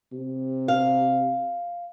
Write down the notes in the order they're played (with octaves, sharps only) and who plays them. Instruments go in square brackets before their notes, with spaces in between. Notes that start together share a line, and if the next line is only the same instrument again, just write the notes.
[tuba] C3
[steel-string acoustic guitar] F5